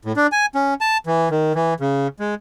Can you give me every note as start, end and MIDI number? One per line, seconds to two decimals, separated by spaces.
0.05 0.12 45
0.17 0.27 62
0.32 0.46 80
0.55 0.74 61
0.81 0.97 81
1.07 1.29 52
1.31 1.53 51
1.55 1.74 52
1.80 2.07 49
2.20 2.35 56